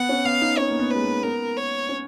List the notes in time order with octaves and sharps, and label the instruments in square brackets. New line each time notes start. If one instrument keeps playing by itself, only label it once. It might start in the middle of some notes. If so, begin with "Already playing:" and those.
Already playing: [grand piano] B3 [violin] F#5
[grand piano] C#4
[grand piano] B3 [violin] F5
[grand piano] D#4
[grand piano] C#4 [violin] C#5
[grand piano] A#3
B3
[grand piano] G#3 [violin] B4
[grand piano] A#3
[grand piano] B3 [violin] A#4
[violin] C#5
[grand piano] C#4